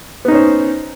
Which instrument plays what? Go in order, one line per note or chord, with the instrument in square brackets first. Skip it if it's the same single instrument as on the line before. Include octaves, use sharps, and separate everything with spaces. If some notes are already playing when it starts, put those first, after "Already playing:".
[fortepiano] B3
D#4
C#4
C5